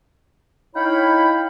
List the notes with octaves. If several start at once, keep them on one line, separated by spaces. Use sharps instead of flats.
D#4 E4 C#5 F5 G5 B5